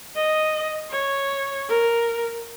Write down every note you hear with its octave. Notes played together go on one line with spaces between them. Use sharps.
D#5
C#5
A#4